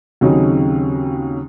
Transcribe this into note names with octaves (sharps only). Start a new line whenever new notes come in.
D#2 C#3 F#3 C4 D#4